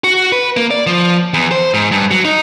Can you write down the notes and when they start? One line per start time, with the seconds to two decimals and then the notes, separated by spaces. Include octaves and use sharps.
0.04 F#4
0.32 B4
0.57 A#3
0.71 D5
0.87 F3
1.34 E2
1.51 C5
1.74 G#2
1.92 G2
2.11 F#3
2.25 D#4